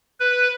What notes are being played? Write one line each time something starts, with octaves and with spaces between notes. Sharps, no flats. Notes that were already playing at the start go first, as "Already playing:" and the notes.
B4